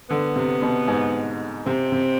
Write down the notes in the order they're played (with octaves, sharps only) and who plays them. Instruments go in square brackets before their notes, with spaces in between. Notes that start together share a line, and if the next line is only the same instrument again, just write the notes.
[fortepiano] D3 [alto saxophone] B3
[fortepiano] C3
B2
G#2
[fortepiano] C3 [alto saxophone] C4
[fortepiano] C3